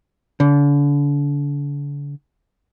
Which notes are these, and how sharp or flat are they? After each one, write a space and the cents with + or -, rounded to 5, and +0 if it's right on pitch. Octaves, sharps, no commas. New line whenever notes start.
D3 -40